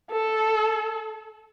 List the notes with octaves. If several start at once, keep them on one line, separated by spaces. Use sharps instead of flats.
A4